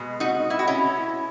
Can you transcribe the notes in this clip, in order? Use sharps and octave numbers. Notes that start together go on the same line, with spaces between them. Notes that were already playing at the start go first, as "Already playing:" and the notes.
Already playing: B2 G#3
D#4 F#4
E4
F#4
C#4 E4